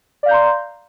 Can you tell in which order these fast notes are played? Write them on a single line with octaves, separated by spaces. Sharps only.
D5 F5 G6 A#5 C6